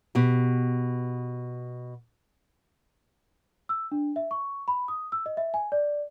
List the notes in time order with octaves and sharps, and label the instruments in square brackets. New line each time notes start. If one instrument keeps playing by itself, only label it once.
[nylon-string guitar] B2 G4
[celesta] E6
D4
E5
C#6
B5
D#6
E6
D#5
E5
G#5
D5